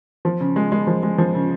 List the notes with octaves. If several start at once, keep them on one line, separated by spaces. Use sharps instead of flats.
F3
C#3
G#3
G#3
F3
G#3
F3
C#3